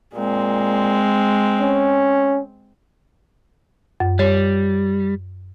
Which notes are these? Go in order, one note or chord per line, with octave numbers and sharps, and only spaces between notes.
A#2 G#3 C4
C#4
F#2
G3 C#5